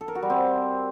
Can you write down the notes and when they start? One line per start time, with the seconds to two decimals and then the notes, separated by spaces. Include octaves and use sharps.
0.01 A4
0.08 A#4
0.15 F#4
0.22 G3
0.30 C4